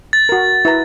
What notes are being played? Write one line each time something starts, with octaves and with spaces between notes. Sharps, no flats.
A6
F#4 A#4
E4 B4 A#5